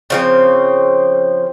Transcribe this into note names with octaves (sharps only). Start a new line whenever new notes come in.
C#3 F3 C4